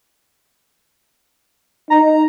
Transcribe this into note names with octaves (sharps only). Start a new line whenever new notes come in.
D#4 A#5